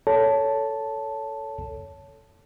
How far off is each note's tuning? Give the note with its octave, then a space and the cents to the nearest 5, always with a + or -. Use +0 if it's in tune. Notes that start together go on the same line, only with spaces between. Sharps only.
A4 +5 C#5 +15 A5 +0